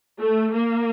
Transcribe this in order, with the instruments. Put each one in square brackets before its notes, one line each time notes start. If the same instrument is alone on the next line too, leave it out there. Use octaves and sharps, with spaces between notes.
[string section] A3
A#3